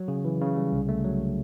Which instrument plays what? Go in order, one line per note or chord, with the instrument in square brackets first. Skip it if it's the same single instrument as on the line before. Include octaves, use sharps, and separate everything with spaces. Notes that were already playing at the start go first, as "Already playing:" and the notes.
Already playing: [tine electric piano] F#3
C#3
E3
C#3
G3
C2
A3
F#3